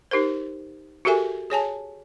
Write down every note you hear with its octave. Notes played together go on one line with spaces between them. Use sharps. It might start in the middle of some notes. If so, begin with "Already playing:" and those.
D#4 G4 A#4 C5
F#4 G4 A4 A#4 E5 G#5
G#4 C#5 G#5 A5